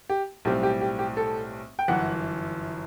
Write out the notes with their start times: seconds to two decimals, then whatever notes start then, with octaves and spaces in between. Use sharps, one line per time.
0.10 G4
0.45 B1 A2 G3 C4 G4
0.63 G4
0.81 G4
0.99 G4
1.17 A4
1.79 G5
1.88 G1 F#2 E3 F#5